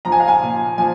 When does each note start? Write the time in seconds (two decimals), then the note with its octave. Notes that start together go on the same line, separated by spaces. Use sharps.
0.05 F3 A#5
0.12 G#5
0.20 F5
0.28 G#5
0.42 A#2
0.78 F3 G#5